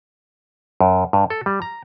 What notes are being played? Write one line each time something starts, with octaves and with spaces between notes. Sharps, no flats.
F#2
G2
A4
G3
A#5